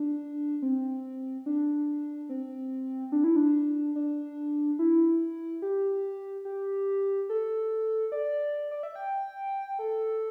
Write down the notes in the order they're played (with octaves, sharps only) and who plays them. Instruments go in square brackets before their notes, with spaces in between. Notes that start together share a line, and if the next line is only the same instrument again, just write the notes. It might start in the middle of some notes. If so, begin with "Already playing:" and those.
Already playing: [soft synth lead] D4
C4
D4
C4
D4
E4
D4
D4
E4
G4
G4
A4
D5
D5
E5
G5
A4